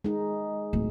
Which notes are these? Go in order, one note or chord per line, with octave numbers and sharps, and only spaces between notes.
G#3 D#4
D1